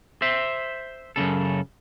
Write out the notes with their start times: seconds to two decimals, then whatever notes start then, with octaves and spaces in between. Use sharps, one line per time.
0.22 C5 E5
1.16 F#2 A2 C#3 A4